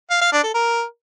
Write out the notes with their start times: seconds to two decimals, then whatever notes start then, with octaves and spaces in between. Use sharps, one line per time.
0.10 F5
0.21 F5
0.32 D4
0.43 A4
0.54 A#4